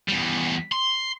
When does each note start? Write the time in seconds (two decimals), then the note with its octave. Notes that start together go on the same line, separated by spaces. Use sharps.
0.08 E2 G3
0.72 C6